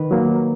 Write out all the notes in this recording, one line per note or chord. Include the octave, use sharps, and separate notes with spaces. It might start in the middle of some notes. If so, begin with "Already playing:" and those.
Already playing: D#3 B4
F#3 A#3